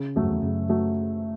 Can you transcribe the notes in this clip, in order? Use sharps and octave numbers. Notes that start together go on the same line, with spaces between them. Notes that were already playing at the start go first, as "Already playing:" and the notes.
Already playing: C#3
E2 F#3 A3
F#2
E2
F#2 C#3
F#3 A3